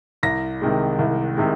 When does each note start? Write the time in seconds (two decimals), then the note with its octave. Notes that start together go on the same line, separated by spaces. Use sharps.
0.23 C2 A#6
0.61 C3 D#3 G#3
0.99 C2
1.37 C3 D#3 G#3